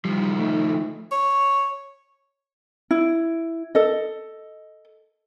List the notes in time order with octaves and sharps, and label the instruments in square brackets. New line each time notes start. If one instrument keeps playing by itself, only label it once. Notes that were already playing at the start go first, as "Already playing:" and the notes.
[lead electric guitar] D#3 F3 [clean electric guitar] G3
[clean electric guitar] A3 D#4 E4
[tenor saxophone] C#5
[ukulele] E4
A4 D#5